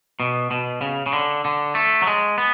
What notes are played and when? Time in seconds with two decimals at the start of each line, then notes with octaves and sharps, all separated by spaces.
0.20 B2
0.51 B2
0.81 C#3
1.06 C#3
1.13 D3
1.45 D3
1.75 A3
2.02 F#3
2.07 G#3
2.38 B3